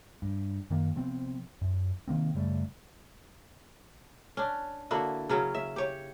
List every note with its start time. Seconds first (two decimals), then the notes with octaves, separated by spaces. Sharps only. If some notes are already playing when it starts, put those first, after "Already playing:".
0.22 G2
0.70 F#2 D#3 A#3
0.96 C3 F3 B3 C4
1.61 F#2
2.08 C3 D#3 A#3 C4
2.34 F#2 C#3 G3 A3
4.37 C#4 D4
4.91 D3 A#3 E4 F#4
5.29 C#3 F#3 C#4
5.54 E5
5.76 G4 C#5